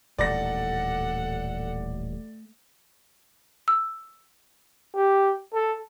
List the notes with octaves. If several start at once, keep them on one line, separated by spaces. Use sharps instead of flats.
D#1 A1 D#3 A3 A4 D5 F#5 A#6
E6
G4
A4